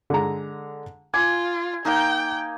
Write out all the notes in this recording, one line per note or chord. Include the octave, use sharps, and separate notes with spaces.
D3 G#3 A#5
F4 G#5 D6
A#3 D#4 G5